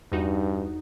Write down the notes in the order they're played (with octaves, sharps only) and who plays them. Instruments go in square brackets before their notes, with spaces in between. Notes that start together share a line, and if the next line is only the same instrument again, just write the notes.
[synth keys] E2 D#4 F#4 [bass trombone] G2